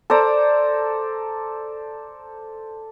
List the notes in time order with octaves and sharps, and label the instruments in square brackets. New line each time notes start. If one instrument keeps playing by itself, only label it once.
[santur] A4 C5 D5 A#5